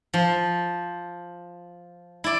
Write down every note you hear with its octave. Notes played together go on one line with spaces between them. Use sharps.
F3
E4 D5